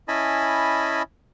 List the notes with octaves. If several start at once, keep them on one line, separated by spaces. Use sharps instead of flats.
C#4 E4 D#5 G#5 A5 B5